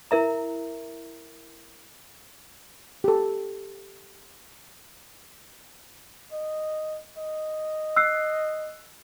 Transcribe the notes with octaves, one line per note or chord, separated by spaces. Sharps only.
E4 A#4 E5 A#5
G4 A4
D#5
D#5
E6 F#6 C7